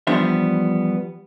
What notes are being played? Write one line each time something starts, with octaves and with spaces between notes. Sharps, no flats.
E3 F3 G3 B3 D4 E5